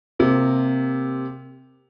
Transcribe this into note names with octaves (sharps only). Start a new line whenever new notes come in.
C3 A#3